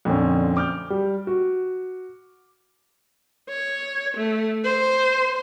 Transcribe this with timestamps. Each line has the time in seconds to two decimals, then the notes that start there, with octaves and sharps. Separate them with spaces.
0.05 F2 A#2 D3 C4 C#4
0.57 D6 F6 G6
0.90 G3
1.27 F#4
3.49 C#5
4.17 A3
4.64 C5